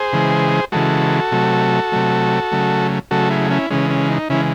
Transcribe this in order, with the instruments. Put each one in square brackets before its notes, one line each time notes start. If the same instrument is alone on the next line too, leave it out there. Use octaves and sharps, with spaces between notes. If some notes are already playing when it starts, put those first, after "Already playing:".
Already playing: [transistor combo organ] G#4 C5
C#3 E3 G#3
C#3 E3 G#3 F#4 A4
C3 F#3 A3
C3 F#3 A3
C#3 F#3 A3
C#3 F#3 A3 F#4 A4
E4 G#4
C#4 E4
C#3 E3 G#3 C#4
C#4
D#4
C#3 E3 G#3 C#4 E4